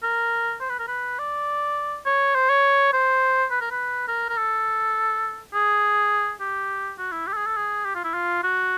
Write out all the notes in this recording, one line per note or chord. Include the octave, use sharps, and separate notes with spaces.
A#4
C5
B4
A#4
B4
D5
C#5
C5
C#5
C5
B4
A#4
B4
A#4
A#4
A4
G#4
G4
F#4
E4
G4
A4
G#4
A4
G#4
G4
F4
E4
F4
F#4